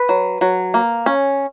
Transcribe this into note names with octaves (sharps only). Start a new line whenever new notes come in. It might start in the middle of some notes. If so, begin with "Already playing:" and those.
Already playing: B4
F#3
F#3
A#3
C#4